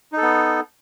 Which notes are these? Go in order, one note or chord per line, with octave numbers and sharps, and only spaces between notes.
B3 D#4 A4